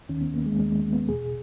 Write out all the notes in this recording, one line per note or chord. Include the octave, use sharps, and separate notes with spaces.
D#2 D#3 C#4
B3
A#3
G#3
D#2 D#3 G#3
B3
E2 B2 G#4